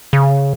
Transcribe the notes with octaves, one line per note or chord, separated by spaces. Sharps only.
C#3